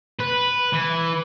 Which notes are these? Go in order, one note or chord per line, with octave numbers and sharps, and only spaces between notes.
B4
E3